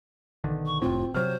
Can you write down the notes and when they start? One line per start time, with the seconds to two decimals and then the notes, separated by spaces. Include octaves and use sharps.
0.44 B1 D3 D#3
0.66 C#6
0.82 F1 A2 C4 F4
1.14 C3 F#3 C5 F6